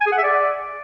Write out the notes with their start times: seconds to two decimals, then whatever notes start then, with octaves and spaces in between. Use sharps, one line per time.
0.01 G#5
0.06 G#4
0.12 F#5
0.18 E5
0.23 D5